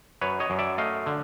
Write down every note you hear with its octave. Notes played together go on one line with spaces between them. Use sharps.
F#2 B4 C#5
C#5 D#5
F#2
D5 E5
A3 D#5 F5
D3